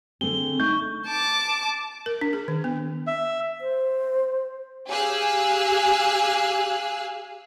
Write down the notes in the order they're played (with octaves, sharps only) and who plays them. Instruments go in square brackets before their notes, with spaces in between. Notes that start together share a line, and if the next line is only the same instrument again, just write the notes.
[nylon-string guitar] D3 A3 G#4 [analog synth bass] C4 [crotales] G7
[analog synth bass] A3 [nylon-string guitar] D#4 [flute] C#6 [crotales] G6
[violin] A5 D6
[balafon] A#4
D4
G#4
D#3
B3
[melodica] E5
[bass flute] C5
[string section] G4 G#4 F5 G#5 E6 F#6